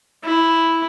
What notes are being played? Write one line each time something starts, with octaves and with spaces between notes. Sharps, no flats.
E4